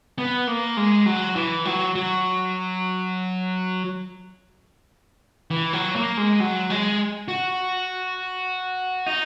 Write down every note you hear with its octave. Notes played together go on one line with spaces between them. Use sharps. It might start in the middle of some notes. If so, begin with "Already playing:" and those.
B3
A#3
G#3
F#3
E3
F#3
F#3
E3
F#3
A#3
G#3
F#3
G#3
F#4
D#4